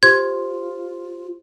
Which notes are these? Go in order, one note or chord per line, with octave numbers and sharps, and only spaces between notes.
F4 G4 C5 C6 G#6